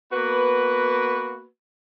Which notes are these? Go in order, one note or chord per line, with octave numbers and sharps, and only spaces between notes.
A#3 B3 F#4 B4